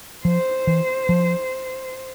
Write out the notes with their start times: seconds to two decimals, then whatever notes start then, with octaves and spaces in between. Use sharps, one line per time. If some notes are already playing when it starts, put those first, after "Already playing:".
0.25 F3 C5
0.67 E3
1.09 F3